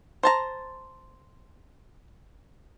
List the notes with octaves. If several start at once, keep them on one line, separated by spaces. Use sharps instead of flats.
C5 A5 A#5